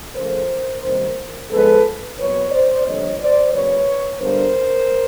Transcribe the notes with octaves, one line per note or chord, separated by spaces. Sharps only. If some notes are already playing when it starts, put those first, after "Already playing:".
C#3 F3 A3 A#4 C5
C3 D#3 G3 A#3
G#2 F3 G#3 B3 A4 B4
A#2 F#3 B3 B4 C#5
C5 D5
F2 D3 G3 A#3 C#5 D#5
C5 D5
C#3 F#3 A#3 B4 C#5
G2 D3 G3 B3 A#4 C5